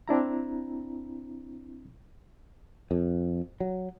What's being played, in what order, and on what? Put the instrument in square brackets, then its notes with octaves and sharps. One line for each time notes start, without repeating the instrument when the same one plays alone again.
[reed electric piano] C4 D4 E4 A#5
[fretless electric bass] F2
F#3